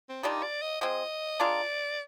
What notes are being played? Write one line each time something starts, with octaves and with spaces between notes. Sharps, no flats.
C4
D#3 G3 D4 D#4 F4
D5
D#5
F3 G#3 C4 D#5
G#3 D4 F4 A#4 D5